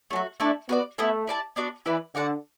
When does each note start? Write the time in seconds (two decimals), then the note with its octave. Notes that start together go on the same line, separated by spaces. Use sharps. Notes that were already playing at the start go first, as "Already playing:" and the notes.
0.11 F#3 A3 D4
0.16 F#4
0.40 A3 D4 E4 D5 A5
0.69 B3 F#4 B4 D5
0.98 A3 B3 E4 A4
1.27 E4 D5 A5
1.56 B3 D4 F#4 D5
1.86 E3 E4 B4 D5
2.15 D3 F#4 D5 F#5 A5